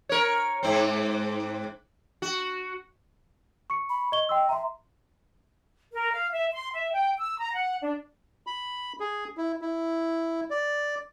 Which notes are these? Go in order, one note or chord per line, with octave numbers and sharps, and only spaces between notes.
A#4 C#5
G#2 C4
F#4
C#6 C#7
B5
D#5 C#6 G7
D#5 G5 C6 E6
E5 A#5 C6
A#4
F5
E5
C6
E5
G5
E6
A#5
F#5
D4
B5
G#4
E4
E4
D5